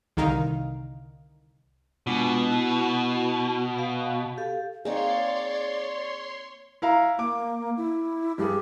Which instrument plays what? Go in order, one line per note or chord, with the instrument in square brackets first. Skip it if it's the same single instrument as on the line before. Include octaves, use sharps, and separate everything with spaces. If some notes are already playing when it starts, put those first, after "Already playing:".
[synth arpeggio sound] C2 D3 D#3 D#4 A#4 F5
[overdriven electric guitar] B2 [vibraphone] G#3 D4 F4
[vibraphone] E4 F#4
F5
G4 A4 F5
[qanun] A#3 C4 D#4 [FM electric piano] G#4 [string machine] C#5 C6 [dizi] D5
[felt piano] E4 F5 A#5
[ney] A#3 [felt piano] D6
[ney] E4
[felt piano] G2 G#4 [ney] G4